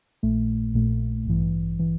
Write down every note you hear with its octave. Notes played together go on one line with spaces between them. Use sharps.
A#1 A#2 A3
A#1 A#2 A3
A1 G2 E3
E3